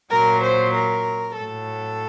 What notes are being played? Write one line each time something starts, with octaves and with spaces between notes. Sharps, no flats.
A#2 F#3 A#4
C5
A#4
A2 F#3 A4